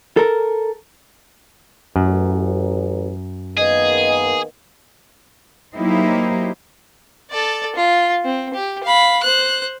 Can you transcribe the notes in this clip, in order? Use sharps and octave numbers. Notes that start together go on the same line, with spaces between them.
A4 A#4
A1 F#2
D#3 A#3 B3 G#4 D#5
F#3 A#3 D#4 E4 G4 C5
A4 D5
F4
C4
G4
F5 B5
C5 F#6